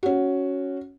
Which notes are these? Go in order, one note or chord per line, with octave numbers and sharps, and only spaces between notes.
C#4 F#4